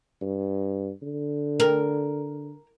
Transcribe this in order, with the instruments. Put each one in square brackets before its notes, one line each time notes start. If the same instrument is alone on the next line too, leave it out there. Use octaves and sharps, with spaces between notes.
[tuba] G2
D3
[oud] A#4